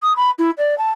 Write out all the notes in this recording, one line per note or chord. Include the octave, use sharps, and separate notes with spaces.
D#6
B5
E4
D5
A5